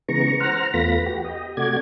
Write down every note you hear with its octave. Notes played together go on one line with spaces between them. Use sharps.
C#3 E3 G#3 B3 A#5 C#6
C5 F#5 A#5 F6
E2 A3 B3 F4 B5 A#6
F#4 G4
G4 D#5
C3 A3 F#4 D5 G#6